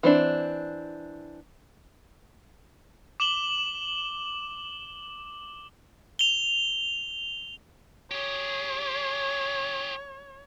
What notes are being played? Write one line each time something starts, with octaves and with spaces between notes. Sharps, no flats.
E3 C4 D4
D6 E7 F#7 G7
F7 G7
G4 G#4 C#5